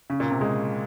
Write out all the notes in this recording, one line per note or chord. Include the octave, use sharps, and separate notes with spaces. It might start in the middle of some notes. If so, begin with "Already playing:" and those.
C#3
A#2
C3
G#3